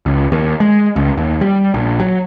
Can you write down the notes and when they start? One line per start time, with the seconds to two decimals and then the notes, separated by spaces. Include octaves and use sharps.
0.06 C#2
0.32 D#2
0.60 G#3
0.96 C#2
1.17 D#2
1.41 G3
1.74 A#1
2.00 F#3